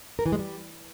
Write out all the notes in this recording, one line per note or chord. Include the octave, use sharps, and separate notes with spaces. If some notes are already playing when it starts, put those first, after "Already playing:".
A#4
E3
G#3
G3